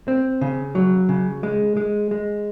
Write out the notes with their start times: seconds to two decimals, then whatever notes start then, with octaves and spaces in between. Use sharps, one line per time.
0.08 C4
0.41 C#3
0.75 F#3
1.09 C#3
1.43 G#3
1.77 G#3
2.11 G#3